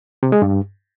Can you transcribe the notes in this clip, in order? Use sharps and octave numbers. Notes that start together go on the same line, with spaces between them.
C3
G#3
G2